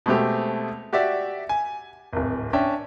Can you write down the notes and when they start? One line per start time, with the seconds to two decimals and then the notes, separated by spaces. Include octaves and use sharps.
0.06 B2 G#3 A3 C4 G4
0.93 F#4 G4 D5 E5
1.49 G#5
2.13 D1 G#1
2.53 C#4 D4 E5 G5